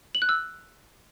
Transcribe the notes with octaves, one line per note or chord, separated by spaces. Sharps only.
F#7
F#6
E6